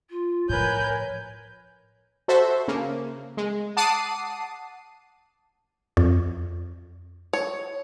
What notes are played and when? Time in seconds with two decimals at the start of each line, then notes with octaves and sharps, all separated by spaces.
0.10 F4
0.49 A2 F3 A#4 B4 C#5 G#5 G6
2.28 F#4 A4 C5 E5
2.68 C#3 A#3
3.37 G#3
3.77 F#5 A5 D6 D#6 C7 D#7
5.97 F2
7.33 C#5